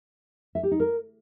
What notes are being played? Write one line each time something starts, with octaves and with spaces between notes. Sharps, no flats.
E5
G4
D#4
A#4